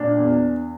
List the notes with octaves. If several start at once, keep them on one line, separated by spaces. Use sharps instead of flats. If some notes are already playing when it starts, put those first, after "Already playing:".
Already playing: A#2 D4
E2